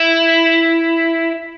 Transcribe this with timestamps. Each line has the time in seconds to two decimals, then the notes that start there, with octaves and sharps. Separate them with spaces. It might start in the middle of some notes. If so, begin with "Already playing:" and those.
Already playing: E4